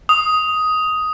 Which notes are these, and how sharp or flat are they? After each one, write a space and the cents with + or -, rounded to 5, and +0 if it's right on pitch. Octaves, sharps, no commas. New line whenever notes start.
D#6 +10